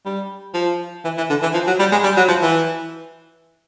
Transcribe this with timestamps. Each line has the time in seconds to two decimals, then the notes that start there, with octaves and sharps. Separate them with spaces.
0.06 G3
0.54 F3
1.05 E3
1.18 E3
1.30 D3
1.42 E3
1.54 F3
1.67 F#3
1.80 G3
1.92 G#3
2.04 G3
2.17 F#3
2.29 F3
2.42 E3